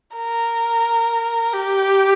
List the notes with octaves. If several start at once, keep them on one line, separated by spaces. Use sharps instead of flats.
A#4
G4